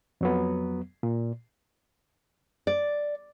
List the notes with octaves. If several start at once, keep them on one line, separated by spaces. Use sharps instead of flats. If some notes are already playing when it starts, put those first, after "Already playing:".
F2 F#3 B3
A#2
D5